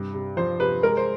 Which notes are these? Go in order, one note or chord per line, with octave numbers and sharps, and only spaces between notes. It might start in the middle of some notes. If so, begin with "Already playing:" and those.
Already playing: G2 C3
C3
F3 C5
C3 B4
G#3 A#4
C5